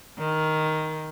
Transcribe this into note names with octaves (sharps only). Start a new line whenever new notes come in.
D#3